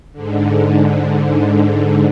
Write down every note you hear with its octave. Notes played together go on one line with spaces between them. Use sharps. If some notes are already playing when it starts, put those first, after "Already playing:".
G#2 D3